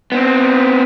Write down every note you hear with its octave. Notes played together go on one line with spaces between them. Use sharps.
B3 C4